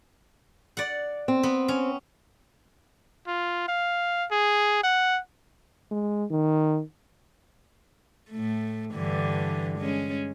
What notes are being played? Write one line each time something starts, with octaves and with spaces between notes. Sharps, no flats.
D5 F#5
C4
B3
C#4
F4
F5
G#4
F#5
G#3
D#3
A2 A3
G2 D3 E3
G#3 C#4